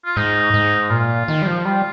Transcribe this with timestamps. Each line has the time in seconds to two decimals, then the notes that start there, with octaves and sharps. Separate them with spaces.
0.05 F4
0.16 G#2 D#4
0.54 G#2
0.90 A#2 F4
1.28 D#3
1.42 G3
1.47 F3
1.65 G3 F4